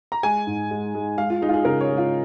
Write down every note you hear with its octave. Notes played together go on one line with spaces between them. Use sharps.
A#5
G#3 G#5
G#2
G#3
G#3
G#3 F5
F4
G#3 D#4
F4
G#4
C#3 A#4
C#5
G#3
F4